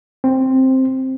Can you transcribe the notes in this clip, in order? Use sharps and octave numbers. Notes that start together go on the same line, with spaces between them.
C4